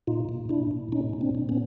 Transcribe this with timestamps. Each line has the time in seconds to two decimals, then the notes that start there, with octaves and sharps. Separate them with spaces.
0.07 A#2 D#4 F4
0.29 A#2
0.49 A#2 D4 E4
0.71 A#2
0.92 A#2 C#4 D#4
1.13 A#2
1.21 C4 D4
1.35 A#2
1.49 B3 C#4